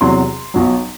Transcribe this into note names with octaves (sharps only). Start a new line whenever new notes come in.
E2 C3 F#3 C6
B1 B2 F#3